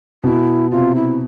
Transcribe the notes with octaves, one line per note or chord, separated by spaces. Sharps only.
B2 E4
C3 F4
E4